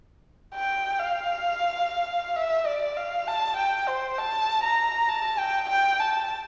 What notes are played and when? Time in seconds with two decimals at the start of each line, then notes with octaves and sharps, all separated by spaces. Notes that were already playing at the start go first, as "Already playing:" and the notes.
0.55 G5
1.00 F5
2.36 E5
2.67 D5
2.97 F5
3.28 A5
3.57 G5
3.88 C5
4.18 A5
4.63 A#5
5.09 A5
5.39 G5
5.70 G5
6.00 A5